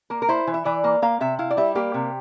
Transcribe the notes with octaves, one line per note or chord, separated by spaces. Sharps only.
A#3 A#4
A#4
E4 C5
E3
E5
E3 D5
A#3
A#3 F5
C3 E5
E4 F5
D5
G3 E5
A#3 G4
C3